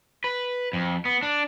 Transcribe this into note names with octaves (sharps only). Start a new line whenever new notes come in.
B4
F2
B3
D4